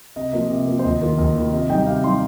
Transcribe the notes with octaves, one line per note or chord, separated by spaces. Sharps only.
C3 D#5
F3 A#3 D#5
C3
F3 A#3
C5
D#2 D#5
D#3 A#3 F4
D#2 D#5
D#3 A#3 F4
C3 D#5
G3 D#4 G5
C3 F5
G3 D#4 C6